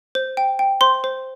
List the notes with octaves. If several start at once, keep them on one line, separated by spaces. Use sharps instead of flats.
C5
G5
G5
C5 C6
C5